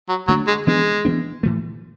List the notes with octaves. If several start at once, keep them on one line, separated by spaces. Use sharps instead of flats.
F#3
D3 F#3 A3 D4
G#3
E3 G#3 B3 D4
E3 B3 D4
A2 E3 A3